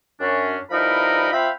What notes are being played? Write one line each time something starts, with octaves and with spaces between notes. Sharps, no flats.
F#2 C#4 D4
G2 F3 D#4 E4 A#4 B5
C4 F4 E5 F5 G5 B5